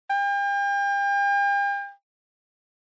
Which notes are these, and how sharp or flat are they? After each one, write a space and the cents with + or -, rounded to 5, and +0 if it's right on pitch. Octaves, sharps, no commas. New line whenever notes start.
G5 +40